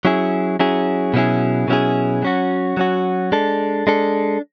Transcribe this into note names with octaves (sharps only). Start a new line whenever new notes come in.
F#3 C#4 E4 G#4
F#3 C#4 E4 G#4
B2 F#3 C#4 E4 G#4
B2 F#3 C#4 E4 G#4
F#3 C#4 F#4
F#3 C#4 F#4
G#3 D4 A4
G#3 D4 A4